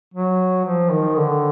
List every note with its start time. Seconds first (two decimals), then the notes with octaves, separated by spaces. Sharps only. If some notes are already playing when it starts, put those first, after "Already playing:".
0.14 F#3
0.65 F3
0.90 D#3
1.16 D3